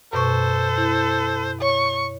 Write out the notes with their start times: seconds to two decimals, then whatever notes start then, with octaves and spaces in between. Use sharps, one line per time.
0.13 F#2 B2 A4 C5 C#6
0.77 E4
1.62 C#5 C#6